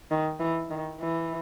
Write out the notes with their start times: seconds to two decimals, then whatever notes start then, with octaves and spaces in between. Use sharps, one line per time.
0.11 D#3
0.39 E3
0.70 D#3
1.00 E3